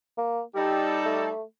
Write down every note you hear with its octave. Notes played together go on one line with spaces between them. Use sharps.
A#3
G3 D#4 G4 A4
A3